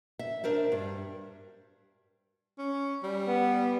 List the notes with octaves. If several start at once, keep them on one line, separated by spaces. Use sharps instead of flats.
E5
D4 A#4 C5 E5
G2
C#4
G3
B3